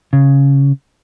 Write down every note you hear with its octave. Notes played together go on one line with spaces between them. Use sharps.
C#3